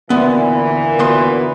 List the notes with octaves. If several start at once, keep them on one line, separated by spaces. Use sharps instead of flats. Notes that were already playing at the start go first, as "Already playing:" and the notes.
D2 A#2 E3 B3
D2 B3 C6